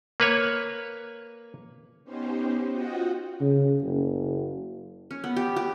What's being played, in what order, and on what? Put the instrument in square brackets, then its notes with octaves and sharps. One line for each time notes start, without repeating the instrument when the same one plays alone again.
[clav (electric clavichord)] A#3 B4 C#5
[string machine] B3 C#4 D#4 G4 C5
F4 F#4 D#5 F#5 G5
[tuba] C#3
F#1
[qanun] C#4
B3
G4
G4